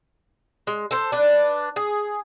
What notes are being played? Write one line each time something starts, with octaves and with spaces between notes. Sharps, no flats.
G#3
A4 C5
D4 B4
G#4